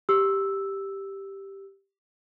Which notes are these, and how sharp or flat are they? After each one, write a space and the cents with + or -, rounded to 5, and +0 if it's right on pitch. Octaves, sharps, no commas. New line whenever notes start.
G4 +0 E6 +0